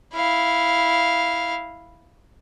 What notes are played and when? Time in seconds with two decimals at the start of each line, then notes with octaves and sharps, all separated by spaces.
0.15 E4 F5